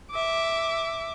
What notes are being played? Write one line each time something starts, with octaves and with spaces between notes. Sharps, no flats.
E5 D6